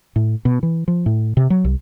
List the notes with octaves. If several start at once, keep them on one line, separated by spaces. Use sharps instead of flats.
A2
B2
E3
F3
A2
C3
F#3
C2